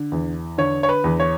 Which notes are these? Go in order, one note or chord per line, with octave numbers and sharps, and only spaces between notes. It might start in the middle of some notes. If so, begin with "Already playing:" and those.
Already playing: D3
E2
D3 C#5
C#5
B4
E2
C#5